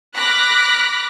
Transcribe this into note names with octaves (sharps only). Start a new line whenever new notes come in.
B5 D6 F6 F#6 A#6 B6